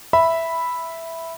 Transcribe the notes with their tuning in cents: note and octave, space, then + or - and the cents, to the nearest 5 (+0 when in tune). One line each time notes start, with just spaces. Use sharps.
E5 +0 B5 +0